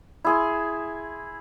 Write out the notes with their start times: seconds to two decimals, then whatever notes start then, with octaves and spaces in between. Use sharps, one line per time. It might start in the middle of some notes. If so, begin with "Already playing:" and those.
0.24 E4 G#4 C6